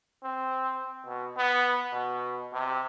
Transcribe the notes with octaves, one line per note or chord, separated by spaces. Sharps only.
C4
B2
B3
B2
C3